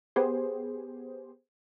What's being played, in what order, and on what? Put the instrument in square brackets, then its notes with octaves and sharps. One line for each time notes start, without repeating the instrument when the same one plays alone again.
[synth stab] B3 G4 G#4 C5